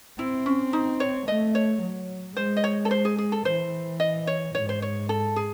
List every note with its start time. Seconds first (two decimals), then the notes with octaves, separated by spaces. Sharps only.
0.19 C4 E4
0.46 C#4
0.73 D#4
1.00 C#5
1.28 A3 D#5
1.55 C#5
1.82 F#3
2.37 G#3 C5
2.57 D#5
2.64 C#5
2.85 A4
2.91 C5
3.05 G#4
3.18 G#4
3.32 A4
3.45 E3 C5
4.00 D#5
4.27 C#5
4.54 G#2 C#5
4.69 C5
4.82 C#5
5.09 A4
5.36 G#4